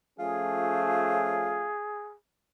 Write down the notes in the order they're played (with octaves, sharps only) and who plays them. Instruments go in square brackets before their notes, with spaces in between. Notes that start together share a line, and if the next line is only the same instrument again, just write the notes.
[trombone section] F3 A3 C#4 [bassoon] F4 [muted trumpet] G#4